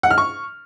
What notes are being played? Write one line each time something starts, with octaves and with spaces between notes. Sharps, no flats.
F#5
F6
C#6